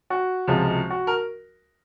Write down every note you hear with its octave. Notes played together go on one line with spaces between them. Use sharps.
F#4
C#2 C3 F3 G#3
F#4
A#4